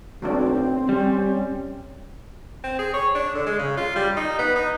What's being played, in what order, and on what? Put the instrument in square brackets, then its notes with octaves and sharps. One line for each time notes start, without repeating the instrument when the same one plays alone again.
[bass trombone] B1 [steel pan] F#3 A3 D4 [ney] C4
[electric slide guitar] G3 [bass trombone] C#4
[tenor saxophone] C4
G#4
C#5
D4
D3
G#3
C#3
F4
G3
D#4
B3
D#4